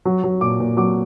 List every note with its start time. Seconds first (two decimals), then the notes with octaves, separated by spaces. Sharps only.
0.05 F#3
0.24 F#3
0.41 A#2 D6
0.60 A#2
0.77 F#3 D6